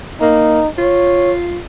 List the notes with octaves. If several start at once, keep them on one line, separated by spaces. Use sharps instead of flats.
A#3 D#4
F4 C#5